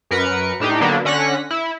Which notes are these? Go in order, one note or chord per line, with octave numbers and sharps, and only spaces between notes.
F#2 A#4 B4 C#7
A2 D4 D#4 G4
D3 F#3 A#3 B3 D4
D3 C#4 F#5 F#6 A#6 B6
E4